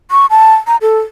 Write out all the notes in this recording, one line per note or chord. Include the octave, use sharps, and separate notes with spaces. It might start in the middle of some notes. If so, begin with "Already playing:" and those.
C#6
A5
A#5
A4